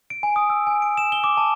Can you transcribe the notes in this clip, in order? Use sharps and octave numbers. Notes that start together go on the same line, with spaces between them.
D7
G#5
D#6
E6
G#5
D7
E7
G7
D6
A5